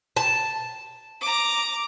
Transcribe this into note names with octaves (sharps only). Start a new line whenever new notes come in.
A5
A#5 D6